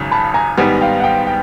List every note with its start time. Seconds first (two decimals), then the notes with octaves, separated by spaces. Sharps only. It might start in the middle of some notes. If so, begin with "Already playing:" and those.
Already playing: G#1 F#2 C#3
0.11 A5 B5
0.34 G#5 A#5
0.58 G#2 D#3 G3 B3 F#5 G#5
0.81 F5 G5
1.00 F#5
1.04 F5 G5
1.27 G5